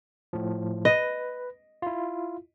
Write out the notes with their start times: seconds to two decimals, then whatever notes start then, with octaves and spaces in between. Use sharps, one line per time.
0.33 A2 F3
0.85 B4 D#5
1.82 E4 F4